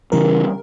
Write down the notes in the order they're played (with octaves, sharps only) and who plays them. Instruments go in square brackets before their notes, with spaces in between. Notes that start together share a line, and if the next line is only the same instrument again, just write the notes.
[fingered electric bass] C#3 E3 G3 [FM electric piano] A#4